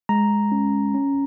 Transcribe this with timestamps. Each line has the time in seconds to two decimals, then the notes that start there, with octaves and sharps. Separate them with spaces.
0.09 G#3 A#5
0.52 C#4
0.94 C#4